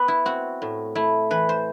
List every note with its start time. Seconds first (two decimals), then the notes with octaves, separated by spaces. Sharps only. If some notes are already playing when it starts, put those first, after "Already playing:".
Already playing: B3 B4
0.08 E4
0.25 C4 F#4
0.62 A2
0.95 A3 E4
1.31 E3 B4
1.49 C5